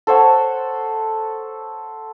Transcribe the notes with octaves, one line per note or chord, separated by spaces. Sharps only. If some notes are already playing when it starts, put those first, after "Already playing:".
A4 C5 C#5 F#5